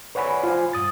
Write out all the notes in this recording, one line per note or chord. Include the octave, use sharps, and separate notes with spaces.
B4 C#5 D5 F#5 G#5 B5
F4 C5 F5 G#5
G2 D#6 A6